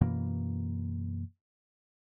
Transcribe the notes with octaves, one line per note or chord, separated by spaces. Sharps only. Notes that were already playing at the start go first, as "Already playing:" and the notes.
F#2 B2 E3 A#3